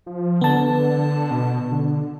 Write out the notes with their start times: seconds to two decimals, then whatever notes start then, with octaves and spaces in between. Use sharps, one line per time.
0.06 F3
0.41 D3 B3 A5
1.31 B2
1.72 D3